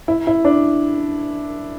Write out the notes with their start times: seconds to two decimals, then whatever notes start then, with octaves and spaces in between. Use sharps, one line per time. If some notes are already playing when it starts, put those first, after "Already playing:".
0.08 E4
0.27 E4
0.45 D4